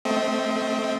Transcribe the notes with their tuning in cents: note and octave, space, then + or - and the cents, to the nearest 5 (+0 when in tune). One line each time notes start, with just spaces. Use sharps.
A3 +0 C4 +0 D#5 +35